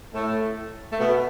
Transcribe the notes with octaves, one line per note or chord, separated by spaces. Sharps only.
A2 A3
A3
B2 B3